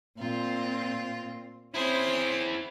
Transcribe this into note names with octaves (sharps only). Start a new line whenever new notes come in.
A#2 C4 F4
C4 C#4 E4 G#4 C5